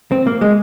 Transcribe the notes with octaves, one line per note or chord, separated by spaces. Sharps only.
C4
A#3
G#3